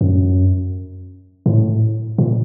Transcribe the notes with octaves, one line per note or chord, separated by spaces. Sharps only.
F#2
A2
A#2